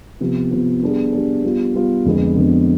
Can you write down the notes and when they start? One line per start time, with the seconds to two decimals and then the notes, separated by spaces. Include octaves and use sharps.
0.20 C3 F3 B3
0.51 C3 F3 B3
0.82 G3 B3 D4 G#4
1.13 G3 B3 D4 G#4
1.44 G3 B3 F4
1.74 G3 B3 F4
2.05 F2 D3 G#3 B3
2.36 F2 D3 G#3 B3